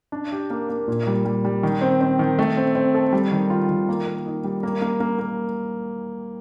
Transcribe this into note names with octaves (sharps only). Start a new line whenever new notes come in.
D4
G4
A#3
A#3
A#2
G3
G3
G3
D#3
C4
C4
D#3
A3
C4
C4
A4
G3
D#3
F4
D#3
A#3
A#3
D#4
G3
A#3
A#3
A#3
A#3